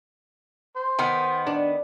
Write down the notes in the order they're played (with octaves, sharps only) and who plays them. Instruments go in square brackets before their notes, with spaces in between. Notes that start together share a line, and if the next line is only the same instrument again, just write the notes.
[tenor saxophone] C5
[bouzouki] D#3 B3
[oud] D4